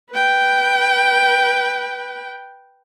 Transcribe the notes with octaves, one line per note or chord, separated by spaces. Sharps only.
B4 G5